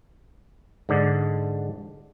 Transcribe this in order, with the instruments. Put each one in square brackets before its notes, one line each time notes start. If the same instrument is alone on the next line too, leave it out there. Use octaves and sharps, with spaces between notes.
[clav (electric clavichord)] G#2 D3 D5